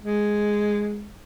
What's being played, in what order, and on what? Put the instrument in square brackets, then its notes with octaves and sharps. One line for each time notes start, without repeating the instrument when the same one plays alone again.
[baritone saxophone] G#3